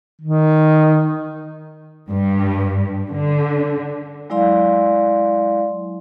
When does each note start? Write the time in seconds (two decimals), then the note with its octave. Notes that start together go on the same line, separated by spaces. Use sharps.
0.21 D#3
2.09 G2
3.09 D3
4.30 F#3 G#3 E4 D5 F5 C6